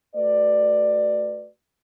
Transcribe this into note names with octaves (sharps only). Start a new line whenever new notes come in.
A3 F#4 B4 D5